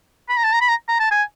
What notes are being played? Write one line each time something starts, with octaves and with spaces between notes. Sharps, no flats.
B5
A#5
A5
A#5
B5
A#5
A#5
A5
G#5